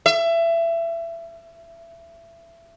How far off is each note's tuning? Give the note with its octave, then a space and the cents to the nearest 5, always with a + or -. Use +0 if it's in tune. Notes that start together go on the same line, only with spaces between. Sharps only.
E5 +25